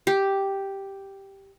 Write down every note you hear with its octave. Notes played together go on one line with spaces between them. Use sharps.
G4